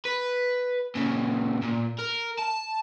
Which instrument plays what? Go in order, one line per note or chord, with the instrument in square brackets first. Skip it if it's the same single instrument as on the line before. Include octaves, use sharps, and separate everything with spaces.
[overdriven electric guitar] B4
A#2 C#3
A#2
A#4
A5